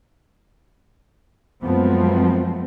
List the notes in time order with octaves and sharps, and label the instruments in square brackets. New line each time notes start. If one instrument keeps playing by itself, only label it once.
[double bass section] F#2 F3 G#3 A3 B3 C4